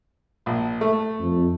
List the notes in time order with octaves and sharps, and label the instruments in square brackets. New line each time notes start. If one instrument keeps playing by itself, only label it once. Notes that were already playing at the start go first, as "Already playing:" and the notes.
[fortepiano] A#1
A3
[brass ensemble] F2